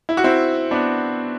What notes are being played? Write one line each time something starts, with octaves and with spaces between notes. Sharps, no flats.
E4
F#4
C4 E4
B3 D4